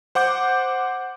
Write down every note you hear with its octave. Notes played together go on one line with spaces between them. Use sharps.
C5 F#5 D6 G6